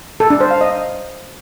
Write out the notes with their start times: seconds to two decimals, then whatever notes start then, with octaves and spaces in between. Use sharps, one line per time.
0.20 A4
0.30 D4
0.41 C5
0.51 F5
0.61 D#5